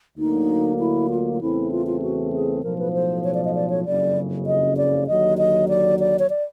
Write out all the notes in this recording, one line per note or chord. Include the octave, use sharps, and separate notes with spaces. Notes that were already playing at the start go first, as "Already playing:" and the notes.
D2 D3 F#3 A#3 D#4
E4
F4
F4
E2 C#3 E3 A3 C4 E4
F4
F4
F#4
G#4
B1 A2 F3 A#4
B4
C5
C#5
D5
D#5
D5
C#5
F#1 F2 C#3 F#3 D5
D#5
D5
D#2 D3 F#3 D#5
D#5
D5
D5
C#5
D5